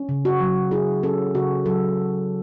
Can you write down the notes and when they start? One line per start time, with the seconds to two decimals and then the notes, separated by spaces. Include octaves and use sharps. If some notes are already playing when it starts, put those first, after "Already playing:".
Already playing: C#4
0.09 C#3
0.25 F#4
0.40 F#3
0.71 E4 G#4
1.03 C#4 A4
1.35 C#3 F#4
1.65 F#3 A4